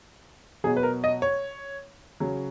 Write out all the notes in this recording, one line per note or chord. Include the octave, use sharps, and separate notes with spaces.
B2 F#3 G#4
B4
A#4
D#5
C#5
C#3 F#3